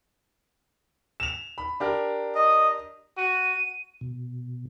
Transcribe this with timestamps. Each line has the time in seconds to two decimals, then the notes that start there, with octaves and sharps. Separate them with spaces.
1.20 E7 F7
1.58 B5
1.80 D4 G4 A#4
2.35 D#5
3.17 F#4 D#7
4.01 B2